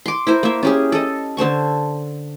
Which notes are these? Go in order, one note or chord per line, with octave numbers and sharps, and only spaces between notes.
C6 D6
E4 A#4 C5
A#3 E5
C#4 G4 G#4
A4 D#5
D3 C5 A5 C#6